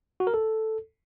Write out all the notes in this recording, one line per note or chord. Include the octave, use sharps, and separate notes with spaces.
F#4
A#4
A4